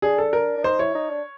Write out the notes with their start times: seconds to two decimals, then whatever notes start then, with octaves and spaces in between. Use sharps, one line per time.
0.02 D4 G#4
0.18 A4
0.33 A#4
0.57 D4
0.64 D#4 C5
0.79 E4 C#5
0.95 D#4
1.10 D4